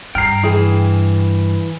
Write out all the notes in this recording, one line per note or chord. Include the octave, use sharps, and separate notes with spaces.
G2 G5 A#5 F6 C7
E3 G#4 G5